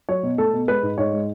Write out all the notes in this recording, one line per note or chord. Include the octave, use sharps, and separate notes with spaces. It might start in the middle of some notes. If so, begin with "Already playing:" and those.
F#3 C#5
B2
A3 A4
B2
G#3 B4
G#2
G#2 C#5
G#3